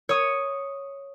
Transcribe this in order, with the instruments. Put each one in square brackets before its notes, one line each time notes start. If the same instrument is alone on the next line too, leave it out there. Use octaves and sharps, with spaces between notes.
[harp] C#5 D#6